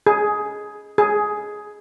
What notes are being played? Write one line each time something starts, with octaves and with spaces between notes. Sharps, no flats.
G#4
G#4